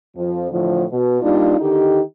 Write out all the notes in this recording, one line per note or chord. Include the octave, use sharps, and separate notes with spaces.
F2 F3
A2 D3 E3 F3
B2
G3 A#3 D4 D#4 F4
D3 D#3 D#4 G4